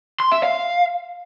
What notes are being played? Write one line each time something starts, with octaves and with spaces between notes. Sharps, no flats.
C6
E5
F5